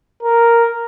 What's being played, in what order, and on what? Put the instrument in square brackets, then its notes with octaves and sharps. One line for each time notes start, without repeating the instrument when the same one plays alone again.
[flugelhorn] A#4